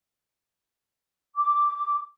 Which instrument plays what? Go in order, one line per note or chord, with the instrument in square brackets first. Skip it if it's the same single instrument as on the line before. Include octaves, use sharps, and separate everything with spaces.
[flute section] D6